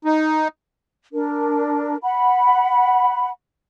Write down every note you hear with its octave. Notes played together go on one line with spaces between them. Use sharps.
D#4
D4 A#4
F#5 B5